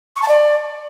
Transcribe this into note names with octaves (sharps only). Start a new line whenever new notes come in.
C#6
A5
D5